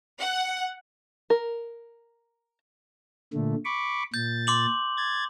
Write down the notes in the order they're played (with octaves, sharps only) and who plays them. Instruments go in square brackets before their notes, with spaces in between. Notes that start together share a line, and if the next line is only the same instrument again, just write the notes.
[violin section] F#5
[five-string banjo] A#4
[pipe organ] A#2 D3 A3
B5 C#6 D6
[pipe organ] A#2 A6 [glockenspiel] G6
[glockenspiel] C6 D6 F#7
[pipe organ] G#6 A6